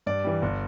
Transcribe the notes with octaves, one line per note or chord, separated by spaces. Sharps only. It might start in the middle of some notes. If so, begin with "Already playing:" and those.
G2 D5
E3 G3
G1